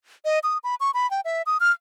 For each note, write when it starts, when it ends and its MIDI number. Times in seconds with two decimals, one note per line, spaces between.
0.25 0.39 75
0.43 0.58 87
0.64 0.75 83
0.80 0.91 85
0.94 1.09 83
1.11 1.21 79
1.25 1.42 76
1.46 1.57 87
1.60 1.71 89